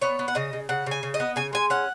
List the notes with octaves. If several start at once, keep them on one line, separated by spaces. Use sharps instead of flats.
B3 C#5
B3
F#5
C#3 D#5
C#3
C#3 F#5
C#3 G#5
C#3
D#5
B3
C#3 G#5
G#3 G#5
C#4 F#5